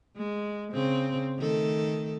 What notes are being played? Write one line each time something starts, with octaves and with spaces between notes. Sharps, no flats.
G#3
C#3 C4
D#3 A3 A4